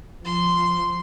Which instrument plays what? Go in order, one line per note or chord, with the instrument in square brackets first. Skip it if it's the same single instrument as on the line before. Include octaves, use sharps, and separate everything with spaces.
[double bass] F3 [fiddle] C6